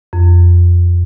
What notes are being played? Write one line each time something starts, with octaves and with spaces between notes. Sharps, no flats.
F2